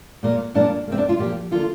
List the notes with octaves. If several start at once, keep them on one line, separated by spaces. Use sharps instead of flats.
A#2 A#3
A#2 A#3 D4
C3 A#3 C4
D4
F4
A#2 F3 A#3 G4
D3 A#3 F4